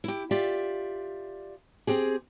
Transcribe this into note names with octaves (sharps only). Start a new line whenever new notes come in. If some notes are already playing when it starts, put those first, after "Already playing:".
E4 G4
F4 G4 D5 E5
C4 G4 G#4